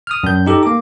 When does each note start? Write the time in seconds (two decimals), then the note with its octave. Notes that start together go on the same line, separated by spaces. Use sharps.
0.07 D#6 F6
0.23 F#2 G6
0.47 D#4 G4 A4
0.63 A#3 D6